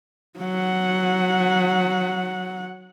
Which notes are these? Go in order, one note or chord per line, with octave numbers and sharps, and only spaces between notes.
F#3 F#5